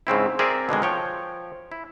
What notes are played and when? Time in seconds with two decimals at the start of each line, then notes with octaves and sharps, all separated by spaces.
0.07 G#2 C#3 C4 E4
0.39 C4 G#4 A#4 D5 E5
0.69 B2 D3 D#3 G#3
0.82 F3 C#5 G5
1.72 E4